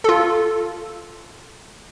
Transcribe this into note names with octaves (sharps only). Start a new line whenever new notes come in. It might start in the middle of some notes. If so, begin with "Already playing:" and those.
F4 A4